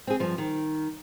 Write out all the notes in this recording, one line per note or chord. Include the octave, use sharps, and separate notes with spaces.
C4 G#4
G2 F3
D#3